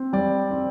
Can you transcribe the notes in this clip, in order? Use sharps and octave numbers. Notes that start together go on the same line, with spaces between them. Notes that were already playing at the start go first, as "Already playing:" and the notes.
Already playing: C4
G3 D5
C4